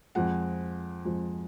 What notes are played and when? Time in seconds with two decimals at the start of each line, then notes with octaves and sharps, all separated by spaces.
0.15 F2 F3 G#3 F#5
1.05 F2 F3 G#3